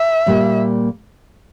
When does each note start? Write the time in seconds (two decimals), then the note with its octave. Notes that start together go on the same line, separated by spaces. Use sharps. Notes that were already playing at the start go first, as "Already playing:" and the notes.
Already playing: E5
0.26 A#2 G3 A#3